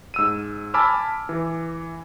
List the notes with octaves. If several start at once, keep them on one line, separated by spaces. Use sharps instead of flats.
G#2 E6 D#7
G#5 A5 B5 D6 E6 F6
E3